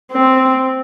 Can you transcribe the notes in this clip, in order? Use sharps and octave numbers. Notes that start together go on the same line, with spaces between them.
C4